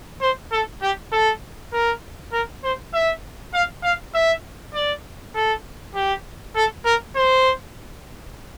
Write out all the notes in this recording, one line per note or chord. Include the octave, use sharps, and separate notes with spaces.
C5
A4
G4
A4
A#4
A#4
C5
E5
F5
F5
E5
D5
A4
G4
A4
A#4
C5